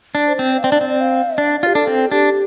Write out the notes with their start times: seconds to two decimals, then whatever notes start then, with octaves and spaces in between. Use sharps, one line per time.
0.15 D4
0.27 C5
0.39 C4
0.58 F5
0.64 C4 D5
0.72 D4
0.81 C4
0.89 D5
1.01 F5
1.37 D4 D5
1.63 F4 G4
1.75 D4 A4
1.87 C4
2.11 D4 G4